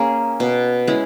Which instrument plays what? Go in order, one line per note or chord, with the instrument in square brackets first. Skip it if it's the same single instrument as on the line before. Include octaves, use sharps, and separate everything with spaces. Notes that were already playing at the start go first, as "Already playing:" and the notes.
Already playing: [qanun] A#3 C#4 G#4 [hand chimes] A#5
[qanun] B2
G#3 C#4 E4